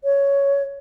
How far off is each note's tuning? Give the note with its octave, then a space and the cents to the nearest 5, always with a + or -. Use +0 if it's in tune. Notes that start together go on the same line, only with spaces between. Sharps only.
C#5 +10